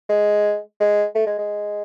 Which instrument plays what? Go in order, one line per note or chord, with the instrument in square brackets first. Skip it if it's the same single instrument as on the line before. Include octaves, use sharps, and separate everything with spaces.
[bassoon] G#3
G#3
A3
G#3
G#3